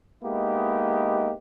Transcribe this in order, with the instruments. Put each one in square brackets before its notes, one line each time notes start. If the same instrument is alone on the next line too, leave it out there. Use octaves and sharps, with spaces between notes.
[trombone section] G#3 A#3 B3 D#4 E4 G4